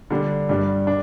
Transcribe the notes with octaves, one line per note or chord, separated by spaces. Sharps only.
D3 G3 D4
G2 G3 D4
D4